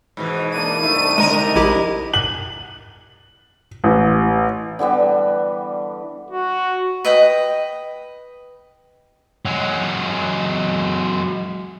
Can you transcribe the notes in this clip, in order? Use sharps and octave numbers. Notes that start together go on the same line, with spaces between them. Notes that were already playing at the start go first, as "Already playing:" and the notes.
G#2 B2 E3
A#3 D4 E4 D#7
C2 A3 D4 D#4
D3 G#3 A#4 D#5
A#1 E4 G4
F#7
A1
D3 E3 G3 B3
F#4
B4 D#5 G5
F#3 G#3